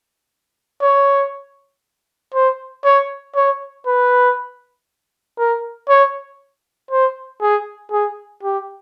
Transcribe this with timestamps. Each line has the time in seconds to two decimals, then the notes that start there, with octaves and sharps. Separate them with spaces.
0.82 C#5
2.34 C5
2.84 C#5
3.36 C#5
3.86 B4
5.38 A#4
5.89 C#5
6.91 C5
7.41 G#4
7.92 G#4
8.43 G4